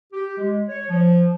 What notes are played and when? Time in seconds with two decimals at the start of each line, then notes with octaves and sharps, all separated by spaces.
0.13 G4
0.38 G#3
0.69 C#5
0.89 F3